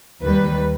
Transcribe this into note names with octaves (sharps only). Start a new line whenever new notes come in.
D#2 D#3 G3 B4